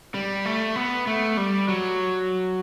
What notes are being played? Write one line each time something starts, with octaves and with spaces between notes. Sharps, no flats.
G3
A3
B3
A3
G3
F#3